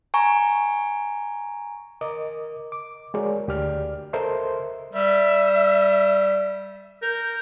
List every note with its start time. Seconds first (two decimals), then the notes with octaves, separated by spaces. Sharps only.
0.14 G#5 A#5 C#6
2.01 A#4 D#5 D6
2.72 D6
3.14 G#3 F#4 G#4 A#4 C#5 D5
3.48 D2 G4 D5 F6
4.13 A4 A#4 C5 D#5 E5 C6
4.93 G3 E5
7.02 A#4 G6